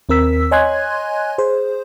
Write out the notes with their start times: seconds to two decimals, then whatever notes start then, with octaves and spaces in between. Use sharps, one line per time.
0.09 D#2 C4 A#4 E6 B6
0.51 C#5 D#5 G#5 C6 F#6 G#6
1.38 G#4 C5